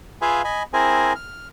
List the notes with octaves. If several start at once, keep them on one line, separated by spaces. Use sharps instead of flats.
F4 G#4 B4 E5 F5 G#5
D#5 G#5 B5
C4 E4 G#4 A#4 C5 G#5
F6